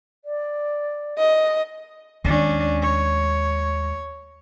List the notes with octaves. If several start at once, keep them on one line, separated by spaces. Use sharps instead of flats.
D5
D#5
D#2 G#3 C#4 D4
C#5